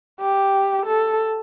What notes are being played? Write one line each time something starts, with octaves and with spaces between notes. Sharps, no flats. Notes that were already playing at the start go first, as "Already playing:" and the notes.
G4
A4